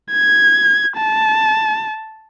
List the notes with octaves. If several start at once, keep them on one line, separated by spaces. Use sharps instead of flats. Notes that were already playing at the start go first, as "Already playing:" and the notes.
G#6
A5